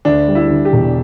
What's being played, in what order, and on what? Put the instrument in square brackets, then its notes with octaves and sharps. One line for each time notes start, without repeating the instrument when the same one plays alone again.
[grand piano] D2 [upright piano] D4
[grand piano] G3
[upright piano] E4
[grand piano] D3
[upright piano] G4
[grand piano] E1